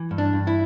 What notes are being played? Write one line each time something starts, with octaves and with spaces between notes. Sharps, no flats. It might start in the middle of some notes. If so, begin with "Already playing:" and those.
Already playing: E3
G2
D4
G2
E4